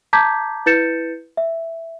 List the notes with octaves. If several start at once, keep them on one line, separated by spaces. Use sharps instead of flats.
A5 A#5 D6 G6 G#6 B6
E4 B4 G6 A6 C#7 E7
E5